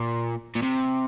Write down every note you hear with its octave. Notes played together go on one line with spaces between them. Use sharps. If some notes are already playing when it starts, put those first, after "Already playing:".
Already playing: A#2
A#2
C3